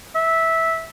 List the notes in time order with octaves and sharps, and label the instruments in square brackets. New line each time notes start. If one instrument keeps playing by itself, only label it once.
[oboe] E5